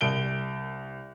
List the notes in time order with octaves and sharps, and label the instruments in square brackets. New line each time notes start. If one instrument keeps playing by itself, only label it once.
[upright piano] C2 D7 G7